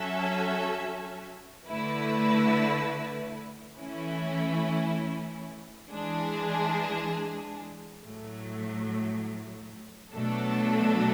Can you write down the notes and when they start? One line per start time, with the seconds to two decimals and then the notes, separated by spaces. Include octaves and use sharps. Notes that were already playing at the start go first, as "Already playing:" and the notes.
Already playing: F#3 C#4 F#4 A4 E5
1.67 D3 A3 E4 B4
3.78 E3 A3 C#4 E4
5.90 E3 G#3 D4 G#4
8.03 A2 F#3 A3
10.14 B2 F#3 A3 D4 A4